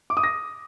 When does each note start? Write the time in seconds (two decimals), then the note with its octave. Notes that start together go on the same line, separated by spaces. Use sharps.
0.10 D6
0.17 D#6
0.24 A#6